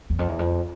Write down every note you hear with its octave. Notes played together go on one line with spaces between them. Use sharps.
E2
F2
E2
F2